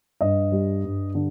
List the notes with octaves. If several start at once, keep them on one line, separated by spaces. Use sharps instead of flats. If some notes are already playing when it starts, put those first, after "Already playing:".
G2 D#5
G3
G2
D3